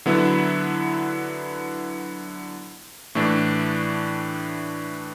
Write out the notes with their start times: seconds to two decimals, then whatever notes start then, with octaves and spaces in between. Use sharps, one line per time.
0.06 D3 F#3 B3 E4
3.15 A2 E3 A3 D4